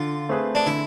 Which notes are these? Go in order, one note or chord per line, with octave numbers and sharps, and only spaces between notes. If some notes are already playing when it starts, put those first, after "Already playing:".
Already playing: D3 F4
A3 C4 G#4 B4
D4
D3 E4